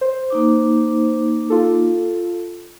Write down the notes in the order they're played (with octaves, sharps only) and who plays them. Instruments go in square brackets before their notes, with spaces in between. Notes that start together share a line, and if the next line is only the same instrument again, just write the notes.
[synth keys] C5
[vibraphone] A#3 D#4 D6
[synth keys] F4 A4